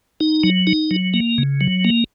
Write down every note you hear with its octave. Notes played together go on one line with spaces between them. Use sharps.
D#4
F#3
D#4
F#3
A#3
C#3
F#3
A#3